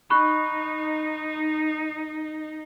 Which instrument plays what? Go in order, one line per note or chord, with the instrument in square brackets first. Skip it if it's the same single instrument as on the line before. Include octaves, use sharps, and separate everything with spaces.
[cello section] D#4 [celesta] B5 C#6 F#6